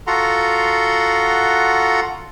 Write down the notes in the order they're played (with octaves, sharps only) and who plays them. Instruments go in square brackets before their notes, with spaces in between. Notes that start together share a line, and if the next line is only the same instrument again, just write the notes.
[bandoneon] F4 F#4 A4 F#5 A#5 C6